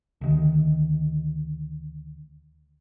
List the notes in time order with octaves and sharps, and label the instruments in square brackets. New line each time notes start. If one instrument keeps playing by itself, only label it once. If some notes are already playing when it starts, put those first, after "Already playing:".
[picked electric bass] D2 D#3